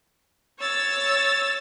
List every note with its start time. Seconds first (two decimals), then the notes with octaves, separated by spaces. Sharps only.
0.59 C#5 E6 A6